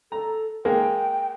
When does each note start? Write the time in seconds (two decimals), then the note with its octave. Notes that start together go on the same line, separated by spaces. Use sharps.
0.12 A4 A#5
0.65 G#3 A#3 G5